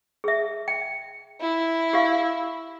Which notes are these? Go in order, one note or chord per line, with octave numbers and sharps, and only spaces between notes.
G#4 E5
G5
E4
G4 F5